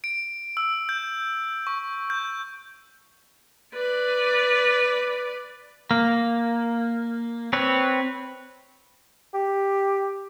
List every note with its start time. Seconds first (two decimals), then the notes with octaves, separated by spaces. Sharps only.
0.04 D7
0.57 E6
0.89 G6
1.67 C#6
2.10 G6
3.74 B4 D5
5.91 A#3
7.53 C4 B4 C#5
9.34 G4